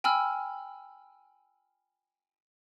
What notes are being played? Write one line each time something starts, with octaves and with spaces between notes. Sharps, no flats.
G5 G#5 B5 E6 F6